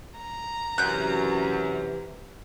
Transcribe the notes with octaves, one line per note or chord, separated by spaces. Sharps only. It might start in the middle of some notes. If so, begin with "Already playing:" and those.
A#5
F#2 C3 E3 F#6 G6